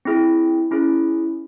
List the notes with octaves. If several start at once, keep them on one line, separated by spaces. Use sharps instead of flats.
C4 E4 G#4
C#4 E4 G#4